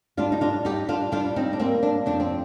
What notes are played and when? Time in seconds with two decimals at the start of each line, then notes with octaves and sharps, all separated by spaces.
0.17 G3 D4 F4
0.32 D#4
0.41 D4 F4
0.65 G3 D#4 G4
0.89 D4 F4
1.12 G3 D4 F4
1.36 C4 D#4
1.53 D4
1.59 A#3 C4
1.83 D4
2.06 F2 D4
2.20 C4